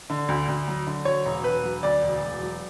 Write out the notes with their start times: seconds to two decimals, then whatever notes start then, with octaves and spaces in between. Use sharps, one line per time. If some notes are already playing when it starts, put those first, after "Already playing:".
0.10 D3
0.28 D2
0.48 D2
0.67 F#3
0.87 D3
1.05 F#3 C#5
1.25 E1
1.44 E1 B4
1.63 F#3
1.83 D2 D5
2.02 E1
2.22 E1
2.41 F#3